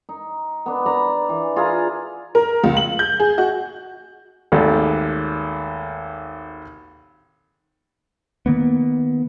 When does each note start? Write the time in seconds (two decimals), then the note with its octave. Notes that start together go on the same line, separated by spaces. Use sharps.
0.09 D#4
0.66 B3 D4
0.86 D5 A#5 B5
1.29 E3
1.56 F4 G#4 F5 A#5
2.35 A#4
2.64 C#2
2.77 F#7
2.99 G6
3.20 G#4
3.38 F#4
4.52 G#1 D#2 A3 D5
8.46 D#3 A#3 B3